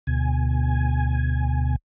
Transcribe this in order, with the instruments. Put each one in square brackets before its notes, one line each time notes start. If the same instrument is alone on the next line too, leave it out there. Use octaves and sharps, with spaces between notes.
[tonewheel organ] D2 B2 G#5